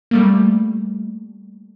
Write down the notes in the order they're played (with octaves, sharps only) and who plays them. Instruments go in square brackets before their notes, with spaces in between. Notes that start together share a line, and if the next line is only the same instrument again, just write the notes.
[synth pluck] G3 A3 A#3